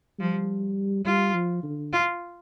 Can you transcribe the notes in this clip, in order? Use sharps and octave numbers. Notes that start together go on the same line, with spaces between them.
F3 G3
G3 F4
F3
D3
F4